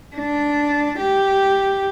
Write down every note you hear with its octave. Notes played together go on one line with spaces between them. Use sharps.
D4
G4